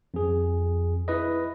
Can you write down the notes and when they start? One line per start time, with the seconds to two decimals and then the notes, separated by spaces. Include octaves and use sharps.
0.14 F2 G#4
1.08 E4 B4 D#5